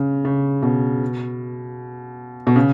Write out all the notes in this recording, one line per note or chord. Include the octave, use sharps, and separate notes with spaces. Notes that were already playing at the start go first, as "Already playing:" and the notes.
Already playing: C#3
C#3
B2
B2
C#3